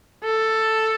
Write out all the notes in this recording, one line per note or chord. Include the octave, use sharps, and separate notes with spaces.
A4